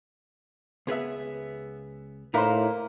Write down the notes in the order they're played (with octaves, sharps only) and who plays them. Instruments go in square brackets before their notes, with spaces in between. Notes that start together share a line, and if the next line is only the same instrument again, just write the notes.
[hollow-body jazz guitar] C#2 G#4 B4 [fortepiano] B3 E5
[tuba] A2 [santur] A#3 [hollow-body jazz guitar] D#4 E4 [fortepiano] B4 C5